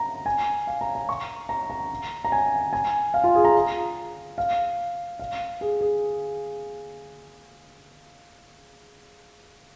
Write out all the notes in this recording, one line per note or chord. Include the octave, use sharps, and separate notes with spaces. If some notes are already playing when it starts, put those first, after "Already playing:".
Already playing: A#5
G#5
F5
A#5
A#5
C#6
A#5
A#5
A#5
G#5
G#5
F5
F4
G#4
A#5
F5
F5
G#4
G#4